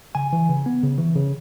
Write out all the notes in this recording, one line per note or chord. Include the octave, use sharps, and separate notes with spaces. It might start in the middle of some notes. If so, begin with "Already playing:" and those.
C#3 G#5
E3
C#3
B3
C#3
E3
C#3